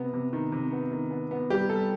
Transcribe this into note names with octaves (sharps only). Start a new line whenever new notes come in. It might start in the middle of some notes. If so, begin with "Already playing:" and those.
Already playing: C3 B3
C3
D#3
C3
B3
D#3
B3
B3
G3 G4
G3 A4